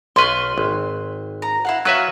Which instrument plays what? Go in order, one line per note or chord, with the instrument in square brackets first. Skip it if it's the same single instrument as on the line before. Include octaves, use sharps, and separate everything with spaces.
[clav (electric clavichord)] B1 B4 [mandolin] C6 C#6 F6
[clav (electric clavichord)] G#1
[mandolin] A#5
E4 F5 F#5
[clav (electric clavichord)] F#3 B4 E5 [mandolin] F#4 C#5 F5